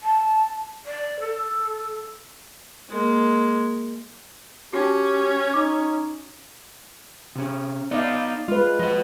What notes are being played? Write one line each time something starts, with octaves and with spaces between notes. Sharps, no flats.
A5
D5
A4
G#3 A#3
C#4 D#4 F#4 G4
D#4 D6
C3 C#4
B3 D#4 D5 D#5 F5
G#3 F4 B4
F3 B4 D#5